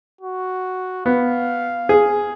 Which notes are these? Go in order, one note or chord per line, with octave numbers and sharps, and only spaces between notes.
F#4
B3 F5
G#4